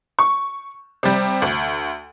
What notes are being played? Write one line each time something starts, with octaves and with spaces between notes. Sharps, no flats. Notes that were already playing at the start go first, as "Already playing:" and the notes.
C#6
C3 G3
D2